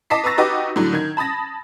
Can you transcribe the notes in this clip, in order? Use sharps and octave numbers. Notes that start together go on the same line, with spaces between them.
D#5 A5 D6 B6 C7
B4 A#5 C#6 E6 A6 A#6
D#4 F#4 G4 B4 D#5 D6
A2 D3 F#3
D#3 G#6
A5 B5 D#6 A6 A#6